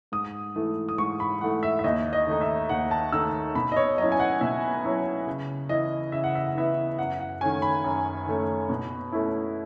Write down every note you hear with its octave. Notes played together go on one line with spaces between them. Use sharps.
G#2 D#6
E3 A3
D#6
G#2 C#6
B5
E3 A3 F#5
E5
E5
D#2 D#5
D#5
D#3 A3 D#4
E5
D#2 F#5
A5
D#3 A3 D#4 E6
B2 B5
D#5
C#5
F#3 C#4 E4 D#5
G#5
F#5
B2 E5
F#3 C#4 E4
C#3
E3 B3 E4 D#5
C#3 E5
F#5
E5
F#5
E3 B3 E4 E5
F#2 F#5
F#5
D#3 A3 C#4 G#5
B5
F#2
D#3 A3 C#4
B2
A3 C#4 E4